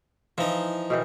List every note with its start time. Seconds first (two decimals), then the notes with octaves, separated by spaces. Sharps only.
0.38 E3 F3 D#4
0.90 B2 D#3 E3